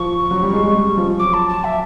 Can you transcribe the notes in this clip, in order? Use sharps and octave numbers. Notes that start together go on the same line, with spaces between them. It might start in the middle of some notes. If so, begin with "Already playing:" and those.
Already playing: F3 C#6
F#3
G3
G#3
G#3
G3
F3
F#3 D6
A5
A5
E5